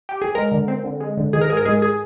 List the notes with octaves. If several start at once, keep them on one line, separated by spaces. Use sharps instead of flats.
G4
G#4
G#3 A#4
D3
C4
D3
G#3
D3
D#3 G#4
A#4
G#2 G#4
A#4
G#3 G#4
G#4